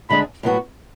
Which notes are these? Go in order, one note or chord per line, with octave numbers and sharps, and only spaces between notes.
D2 D3 G#3 D4 G#4 B5
A2 F#3 B3 F#4